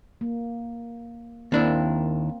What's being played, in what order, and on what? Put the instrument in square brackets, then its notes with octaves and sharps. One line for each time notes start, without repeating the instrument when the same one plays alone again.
[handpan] A#3
[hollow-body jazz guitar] D#2 D4 E4 [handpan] A#3 C4